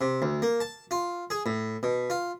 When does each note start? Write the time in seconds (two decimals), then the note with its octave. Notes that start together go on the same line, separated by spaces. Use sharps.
0.01 C3
0.22 D2
0.42 A#3
0.60 A5
0.91 F4
1.30 G#4
1.46 A2
1.83 B2
2.10 F4